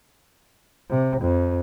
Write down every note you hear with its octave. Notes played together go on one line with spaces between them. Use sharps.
C3
F2